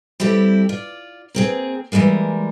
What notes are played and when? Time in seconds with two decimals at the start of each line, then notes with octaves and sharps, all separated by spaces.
0.20 G3 C4 E4 G4 A4
0.69 F4 D5
1.35 A#3 C4 G#4
1.92 E3 F3 G3 G#3 A#3